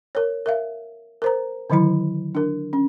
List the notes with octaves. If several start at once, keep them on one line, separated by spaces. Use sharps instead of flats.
A#4 C#5
A#4 E5 F5
A#4 C5 A#5
D3 D#3 F#3 E4 B5
D4 A#4
C#4